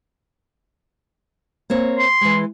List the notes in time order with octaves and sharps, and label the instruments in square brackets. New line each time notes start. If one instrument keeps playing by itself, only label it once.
[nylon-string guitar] A#3 C4 C#5
[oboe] C6
[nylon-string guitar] E3 G#3